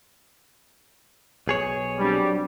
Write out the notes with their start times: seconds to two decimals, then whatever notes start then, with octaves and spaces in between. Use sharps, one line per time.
1.47 B1 G#4 C#5
1.99 F#3 G3 C4 D4